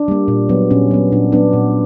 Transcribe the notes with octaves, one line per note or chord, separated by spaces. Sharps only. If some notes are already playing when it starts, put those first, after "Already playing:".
Already playing: D4
G3 A#3
A#2
F#3 B3
A#2 C#4
F#3 B3
A#2 D4
F#3 B3 D4
A#2